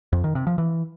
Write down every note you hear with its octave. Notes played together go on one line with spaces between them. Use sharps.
F2
D#3
C3
F3
E3